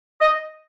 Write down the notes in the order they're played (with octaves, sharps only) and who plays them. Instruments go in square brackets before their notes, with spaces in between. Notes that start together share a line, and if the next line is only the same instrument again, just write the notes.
[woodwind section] D#5